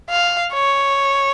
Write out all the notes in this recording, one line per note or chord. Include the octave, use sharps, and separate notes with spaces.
F5
C#5